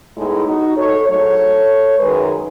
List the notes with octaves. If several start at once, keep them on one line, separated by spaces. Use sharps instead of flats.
A2 G#3 B3 D#4 E4 G#4
D#4 F#4
A4 C#5
G#2 F#3 A3 A4 C#5
F#2 D#3 G#3 G#4 B4